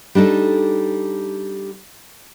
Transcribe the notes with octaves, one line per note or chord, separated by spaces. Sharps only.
G3 D4 D#4 A4